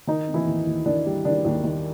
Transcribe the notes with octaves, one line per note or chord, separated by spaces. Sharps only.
D#3 D#4
C4
E3 E4
D#2
D#2
D#3 D4
G3
D#3 D4
D#2
D#3